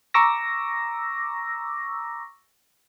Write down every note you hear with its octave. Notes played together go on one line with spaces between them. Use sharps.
A#5 C#6 D6 E6 A#6